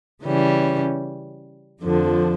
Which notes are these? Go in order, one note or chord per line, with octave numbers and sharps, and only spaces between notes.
C#3 E3 G3 C#4
F2 D3 F3